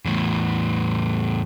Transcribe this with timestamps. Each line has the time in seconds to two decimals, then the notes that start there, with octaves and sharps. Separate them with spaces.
0.05 E2 A2